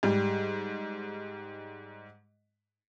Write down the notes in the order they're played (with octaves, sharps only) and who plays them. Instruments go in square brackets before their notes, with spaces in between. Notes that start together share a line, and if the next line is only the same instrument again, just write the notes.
[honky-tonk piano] G#2 G3